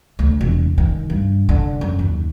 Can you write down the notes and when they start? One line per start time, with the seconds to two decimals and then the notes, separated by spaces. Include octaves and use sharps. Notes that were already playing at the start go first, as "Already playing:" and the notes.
0.19 D2
0.41 E1
0.78 D#3
1.10 G2
1.49 D3
1.81 F#2
1.99 D#2